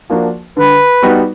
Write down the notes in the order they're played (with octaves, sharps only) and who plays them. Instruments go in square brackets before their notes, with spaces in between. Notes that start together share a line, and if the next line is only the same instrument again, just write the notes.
[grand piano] F3 A#3 D4 F#4
[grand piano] D3 [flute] B4
[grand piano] G3 B3 D#4 F#4